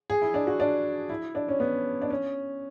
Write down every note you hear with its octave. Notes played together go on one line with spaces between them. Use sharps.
G#4
E4
D4
F#4
D4
E4
D4
C#4
B3
D4
C#4